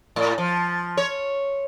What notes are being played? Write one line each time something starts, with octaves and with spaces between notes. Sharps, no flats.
A2
F3
C#5